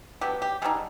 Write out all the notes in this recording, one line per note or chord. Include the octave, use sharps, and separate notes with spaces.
F#3 B3 D4 G4
G4
D3 G3 C4 D#4 G#4